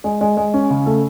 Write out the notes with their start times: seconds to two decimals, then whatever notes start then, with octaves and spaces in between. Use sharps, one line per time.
0.04 G#3
0.21 G#3
0.37 G#3
0.54 C#4
0.71 C#3
0.86 A3